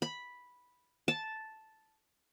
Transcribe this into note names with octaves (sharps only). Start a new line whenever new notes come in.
B5
A5